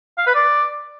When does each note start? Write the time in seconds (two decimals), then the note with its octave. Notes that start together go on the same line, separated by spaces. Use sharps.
0.18 F5
0.26 B4
0.35 D5